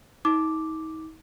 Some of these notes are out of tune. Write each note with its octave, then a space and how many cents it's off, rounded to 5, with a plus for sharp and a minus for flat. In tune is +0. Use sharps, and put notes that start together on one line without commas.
D#4 +40 D6 +0